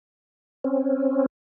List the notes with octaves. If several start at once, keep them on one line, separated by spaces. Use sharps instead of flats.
C4 C#4